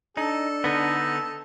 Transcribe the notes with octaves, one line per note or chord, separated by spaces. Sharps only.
D4 D#4 A4
D3 B3 D#4